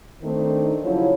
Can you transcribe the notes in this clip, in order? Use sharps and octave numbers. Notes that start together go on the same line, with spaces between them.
D#3 A3 C4 D4 D#4
C#3 F3 F#3 E4 C#5